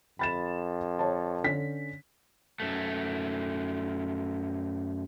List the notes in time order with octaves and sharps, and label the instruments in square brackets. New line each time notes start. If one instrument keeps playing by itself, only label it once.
[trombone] F2 [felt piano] B5 A6 E7
[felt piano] C#5 A5
D3 C#4 B6
[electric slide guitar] F#2 A3